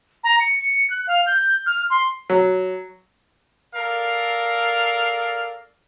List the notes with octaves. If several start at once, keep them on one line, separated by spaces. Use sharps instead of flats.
A#5
C#7
C#7
F#6
F5
G6
F6
C6
F#3
A4 A#4 D5 F5